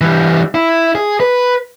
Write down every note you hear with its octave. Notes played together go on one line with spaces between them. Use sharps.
E3 G3
E4
G#4
B4